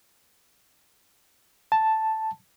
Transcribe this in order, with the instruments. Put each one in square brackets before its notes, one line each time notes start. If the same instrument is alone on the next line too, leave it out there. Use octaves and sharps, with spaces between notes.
[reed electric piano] A5